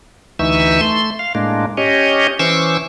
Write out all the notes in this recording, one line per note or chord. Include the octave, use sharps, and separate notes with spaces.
D2 E3 D#4 E5 C#6 E6
A3 C6
F5
A2 G#3 A#3 D4
C#4 G4 C#5 D#5
E3 C#4 C5 C#6 D6 E6